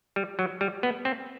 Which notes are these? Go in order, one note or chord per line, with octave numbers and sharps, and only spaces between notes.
G3
F#3
G3
B3
C4